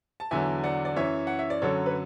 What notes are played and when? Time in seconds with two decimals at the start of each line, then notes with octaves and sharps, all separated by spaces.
0.20 A5
0.31 E2 D3 F#3 E5 G#5
0.64 D5 F#5
0.85 D5
0.96 F#2 E3 C#5 E5
1.27 F#5
1.39 E5
1.50 D5
1.62 F#2 D3 F#3 A4 C#5
1.86 B4